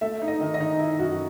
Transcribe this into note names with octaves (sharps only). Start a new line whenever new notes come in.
A3 E5
D#4
D#5
D#3
D#5
D#4
D#4 E4
F#2 F#4